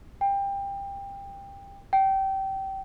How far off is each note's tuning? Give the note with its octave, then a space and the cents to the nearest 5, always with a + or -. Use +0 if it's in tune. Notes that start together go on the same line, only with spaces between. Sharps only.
G5 +20
G5 -25